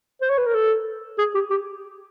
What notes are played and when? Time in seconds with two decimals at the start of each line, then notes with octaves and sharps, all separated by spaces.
0.22 C5
0.30 C#5
0.38 B4
0.46 A#4
0.54 A4
1.19 G#4
1.35 G4
1.51 G4